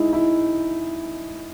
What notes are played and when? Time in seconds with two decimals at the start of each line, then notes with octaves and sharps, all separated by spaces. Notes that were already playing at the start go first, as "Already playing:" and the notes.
Already playing: G#3 D#4 E4
0.13 E4